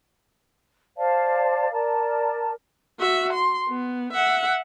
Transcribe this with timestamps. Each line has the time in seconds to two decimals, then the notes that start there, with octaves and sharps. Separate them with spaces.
0.97 C5 D5 F5 A5
1.72 A#4 D5 A5
2.99 F#4 E5
3.33 C6
3.69 B3
4.13 E5 F#5